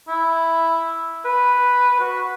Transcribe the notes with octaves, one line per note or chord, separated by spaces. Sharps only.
E4
B4
F#4